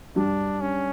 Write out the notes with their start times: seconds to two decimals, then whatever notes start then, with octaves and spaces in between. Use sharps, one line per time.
0.16 G2 G3 D4
0.61 C#4